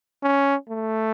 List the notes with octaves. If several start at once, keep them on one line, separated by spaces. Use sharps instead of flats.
C#4
A3